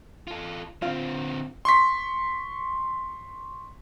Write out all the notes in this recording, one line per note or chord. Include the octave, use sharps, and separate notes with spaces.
F4 A4
D3 C4 F4
C6 C#6 B6